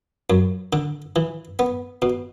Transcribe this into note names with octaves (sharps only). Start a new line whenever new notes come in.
F#2
D3
E3
B3
B2